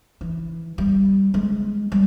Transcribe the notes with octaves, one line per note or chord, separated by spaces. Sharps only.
E3
G3
G#3
G3